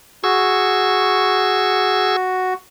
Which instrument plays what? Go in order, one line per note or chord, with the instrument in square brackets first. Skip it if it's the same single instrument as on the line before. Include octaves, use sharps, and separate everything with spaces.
[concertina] F#4 [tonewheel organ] G#4 C#6 E6